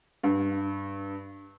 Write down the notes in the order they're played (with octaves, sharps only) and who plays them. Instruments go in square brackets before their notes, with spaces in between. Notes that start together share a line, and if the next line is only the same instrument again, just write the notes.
[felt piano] G2